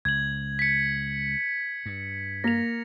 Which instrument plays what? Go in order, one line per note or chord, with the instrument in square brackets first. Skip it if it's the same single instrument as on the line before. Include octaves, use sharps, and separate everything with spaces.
[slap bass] C#2 [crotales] G#6 F#7
[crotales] B6 C#7
[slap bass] G2
[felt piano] A#3 [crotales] A#6 F7